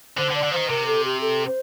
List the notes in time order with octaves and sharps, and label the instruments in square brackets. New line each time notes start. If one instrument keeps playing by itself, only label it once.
[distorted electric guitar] D3 [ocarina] C5
[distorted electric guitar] D3
[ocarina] D5
[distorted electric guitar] D3
[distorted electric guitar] D#3 F3 [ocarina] C5
[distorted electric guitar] C3 [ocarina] A#4
[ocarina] A4
G4
A4
C5